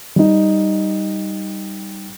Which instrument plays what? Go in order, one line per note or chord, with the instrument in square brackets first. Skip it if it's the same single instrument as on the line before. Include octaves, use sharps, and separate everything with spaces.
[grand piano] G3 D#4